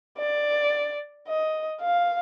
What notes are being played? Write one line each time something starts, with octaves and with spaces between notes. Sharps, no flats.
D5
D#5
F5